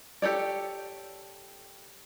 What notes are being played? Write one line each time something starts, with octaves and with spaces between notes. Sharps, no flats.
G4 A4 C#5 D5